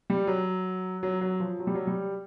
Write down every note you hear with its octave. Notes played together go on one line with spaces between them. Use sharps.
G3
F#3
F#3
F#3
F3
F#3
G3
F#3
G3